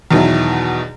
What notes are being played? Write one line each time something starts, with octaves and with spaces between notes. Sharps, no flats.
E2 B2 D#3 F#3 E4